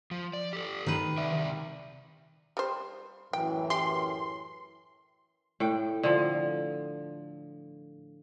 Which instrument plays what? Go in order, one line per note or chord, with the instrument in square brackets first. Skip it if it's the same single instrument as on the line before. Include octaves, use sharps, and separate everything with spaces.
[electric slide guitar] F3
D5
G4 A4
[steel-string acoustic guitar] D#3 B4
[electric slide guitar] C3 D5 E5
[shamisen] G3 C5
[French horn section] F#2 A2 E3 [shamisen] G5
[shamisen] G4 [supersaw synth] C6
[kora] A2 G5
D3 F3